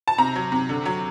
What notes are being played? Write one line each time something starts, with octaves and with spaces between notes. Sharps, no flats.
A5
C3 A#5
F#3
C3
D3
F#3